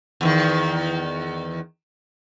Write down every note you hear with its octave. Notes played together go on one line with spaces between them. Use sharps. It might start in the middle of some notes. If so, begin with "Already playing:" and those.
E2 C3 D#3